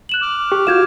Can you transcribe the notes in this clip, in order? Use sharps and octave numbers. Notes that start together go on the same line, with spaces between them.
F#6 E7 F#7
D6 F6
G4 C#6
F4 F#4 F5 G6 G#6 E7